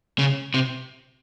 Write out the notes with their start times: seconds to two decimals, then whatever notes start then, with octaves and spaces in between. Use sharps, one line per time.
0.19 C#3
0.54 C3